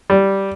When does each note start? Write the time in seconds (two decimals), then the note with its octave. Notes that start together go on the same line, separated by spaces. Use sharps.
0.10 G3